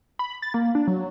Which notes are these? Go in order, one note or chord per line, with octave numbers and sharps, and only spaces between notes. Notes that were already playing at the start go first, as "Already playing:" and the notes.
B5
A6
A#3
D4
F#3